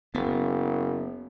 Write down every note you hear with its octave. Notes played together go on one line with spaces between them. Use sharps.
F#1 B3